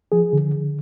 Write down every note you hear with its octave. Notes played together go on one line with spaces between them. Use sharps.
F3 G#4
D3